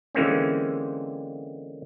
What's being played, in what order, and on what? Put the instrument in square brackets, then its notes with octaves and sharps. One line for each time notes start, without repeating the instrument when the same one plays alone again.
[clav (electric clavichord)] D3 E3 G#3 A#3 C4 C#4